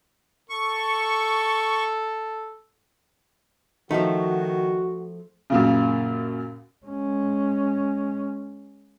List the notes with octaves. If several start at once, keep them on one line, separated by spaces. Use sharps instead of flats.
A4 C#6
D#3 F3 A3 D#4 F#4
F#2 A#2 C#3
G#3 C#4